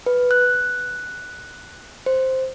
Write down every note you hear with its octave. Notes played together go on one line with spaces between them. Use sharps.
B4
F#6
C5